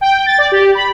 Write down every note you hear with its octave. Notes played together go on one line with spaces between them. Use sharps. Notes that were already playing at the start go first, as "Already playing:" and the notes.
G5
A6
D5
G4
B5